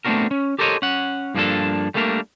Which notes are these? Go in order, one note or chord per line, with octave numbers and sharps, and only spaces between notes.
A3 B3 C4 D4 F#4 A#4
C#4
G4 A4 A#4 C5 C#5 D#5
C#4 F#5
G2 F3 A#3 C#4 D4 A4
G3 A3 A#3 D4 A4 A#4